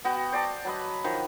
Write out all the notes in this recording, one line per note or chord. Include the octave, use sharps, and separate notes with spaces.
B3 F#4 G5
C5 D5 G5 A5
F#3 B4 D#5
D#3 F3